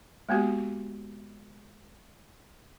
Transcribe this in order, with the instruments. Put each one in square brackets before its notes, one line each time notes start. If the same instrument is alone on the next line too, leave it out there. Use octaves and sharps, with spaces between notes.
[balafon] G#3 A#3 B3 F#4 G4